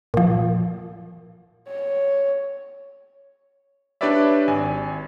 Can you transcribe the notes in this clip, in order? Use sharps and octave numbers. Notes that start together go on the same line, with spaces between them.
A#2 F3
C#5
D4 G4 B4 C#5 D5 E5
G#1 G#5